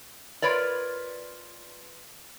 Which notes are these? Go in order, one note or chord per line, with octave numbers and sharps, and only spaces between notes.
F4 A#4 B4 C#5 D5